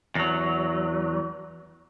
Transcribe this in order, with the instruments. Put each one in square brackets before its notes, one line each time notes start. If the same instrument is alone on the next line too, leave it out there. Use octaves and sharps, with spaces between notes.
[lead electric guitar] E2 F#3